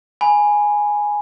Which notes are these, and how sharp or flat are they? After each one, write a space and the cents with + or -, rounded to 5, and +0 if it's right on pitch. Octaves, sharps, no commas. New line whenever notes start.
G#5 +0 B5 -10